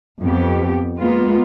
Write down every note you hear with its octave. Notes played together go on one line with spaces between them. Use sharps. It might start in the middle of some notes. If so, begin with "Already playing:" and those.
F2 B3 G4
G#3 A#3 B3 F4